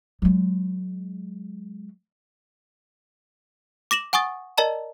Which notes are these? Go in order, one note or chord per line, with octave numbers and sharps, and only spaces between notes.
F#3 G#3
D6 A#6 E7 F#7
F#5 G#5 C#6 D#6 A6
A#4 D5 D#5 A5 A#5